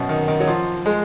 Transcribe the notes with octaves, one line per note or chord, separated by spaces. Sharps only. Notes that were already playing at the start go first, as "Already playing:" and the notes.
Already playing: F#2 B2
D#3
D#3
F#3
F3
G#3